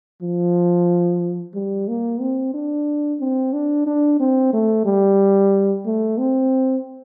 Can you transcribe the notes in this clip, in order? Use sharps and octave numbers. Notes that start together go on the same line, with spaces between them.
F3
G3
A#3
C4
D4
C4
D4
D4
C4
A3
G3
A3
C4